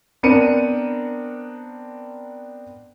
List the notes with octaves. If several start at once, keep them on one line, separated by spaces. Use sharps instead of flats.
B3 C4 D4 A#4 C#7 D#7